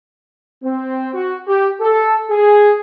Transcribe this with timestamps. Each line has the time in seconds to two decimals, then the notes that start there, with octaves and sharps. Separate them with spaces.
0.64 C4
1.14 F#4
1.47 G4
1.80 A4
2.29 G#4